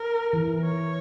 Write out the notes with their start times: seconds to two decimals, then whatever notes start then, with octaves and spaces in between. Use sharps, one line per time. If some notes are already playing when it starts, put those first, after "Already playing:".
Already playing: A#4
0.33 E3
0.64 C#5